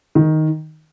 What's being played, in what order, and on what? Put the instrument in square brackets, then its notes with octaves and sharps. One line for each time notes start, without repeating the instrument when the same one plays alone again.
[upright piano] D#3